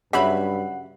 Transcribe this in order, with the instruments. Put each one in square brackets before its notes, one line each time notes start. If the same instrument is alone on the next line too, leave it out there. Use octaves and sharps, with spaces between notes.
[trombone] G2 [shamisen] C#3 F#3 [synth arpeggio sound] E5 B5 [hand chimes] F#5